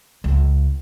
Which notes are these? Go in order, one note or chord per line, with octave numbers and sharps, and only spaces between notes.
C#2